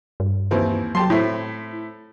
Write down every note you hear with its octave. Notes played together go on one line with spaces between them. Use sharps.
G2
D#2 E3 C4
F#3 G4 A5 C6
A2 A3 C4 E4